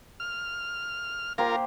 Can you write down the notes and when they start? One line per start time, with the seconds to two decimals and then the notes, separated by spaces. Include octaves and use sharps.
0.20 F6
1.38 A#3 F4 G4 A#4 C5